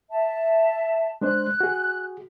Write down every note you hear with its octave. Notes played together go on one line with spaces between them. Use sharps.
E5 A5
G#3 D4 C5 F#6
F#4 G#4